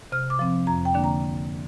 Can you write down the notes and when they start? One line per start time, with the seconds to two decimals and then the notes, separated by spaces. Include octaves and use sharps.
0.12 C3 F6
0.30 D6
0.39 F3 C4
0.67 F2 A#5
0.85 G5
0.94 D3 A#3 D4
1.04 A#5